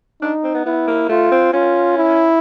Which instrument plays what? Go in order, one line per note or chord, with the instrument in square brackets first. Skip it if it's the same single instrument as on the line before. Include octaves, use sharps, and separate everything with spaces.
[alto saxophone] D4 [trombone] D#4
[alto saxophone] C4
B3
[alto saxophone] B3 [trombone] E4
[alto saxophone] A#3
[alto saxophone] A3 [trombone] F4
[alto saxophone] C4
[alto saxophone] C#4 [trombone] F4
[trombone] E4